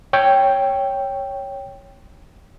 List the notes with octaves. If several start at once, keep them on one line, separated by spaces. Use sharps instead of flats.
C#5 G5